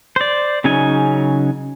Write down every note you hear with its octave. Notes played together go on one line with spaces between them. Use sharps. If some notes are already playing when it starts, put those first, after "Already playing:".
C5 D5
C#3 F#3 C#4 D#4 G#5